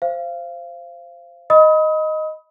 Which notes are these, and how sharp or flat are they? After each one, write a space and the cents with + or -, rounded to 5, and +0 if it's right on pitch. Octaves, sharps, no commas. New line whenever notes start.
C5 +0 F5 -25
D#5 +0 B5 +0 D#6 +35